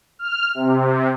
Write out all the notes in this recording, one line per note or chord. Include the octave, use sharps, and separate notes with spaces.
F6
C3